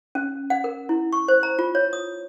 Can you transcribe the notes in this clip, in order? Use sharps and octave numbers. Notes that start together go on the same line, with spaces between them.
C#4
F#5
A#4
E4
C#6
C5
A#5
F4
C#5
D#6